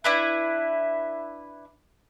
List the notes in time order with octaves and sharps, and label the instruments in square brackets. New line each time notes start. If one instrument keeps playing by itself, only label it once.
[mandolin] D4 E4 B4 [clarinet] E5